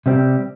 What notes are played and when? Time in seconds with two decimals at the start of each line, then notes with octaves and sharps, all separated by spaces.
0.06 C3 G3 C4 G4